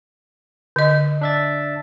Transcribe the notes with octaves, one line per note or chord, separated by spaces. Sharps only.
D3 D#5
D4 E5 A6